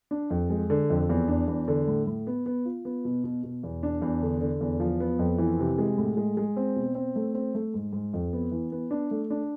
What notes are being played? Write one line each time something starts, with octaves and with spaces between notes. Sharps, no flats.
D4
F2
G#3
D3
F2
E2
D4
E2
D3
A2
A2
B3
B3
F4
B3
B2
B2
B2
E2
D4
E2
D3
D3
E2
F3
B3
F2
E3
C3
G#3
A2
G#3
G#3
C4
B2
C4
A3
C4
A3
G#2
G#2
F2
B3
E3
B3
D4
A3
D4